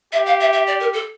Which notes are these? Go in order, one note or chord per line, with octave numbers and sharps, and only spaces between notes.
G4 E5
F5
E5
E5
D5
A#4
A4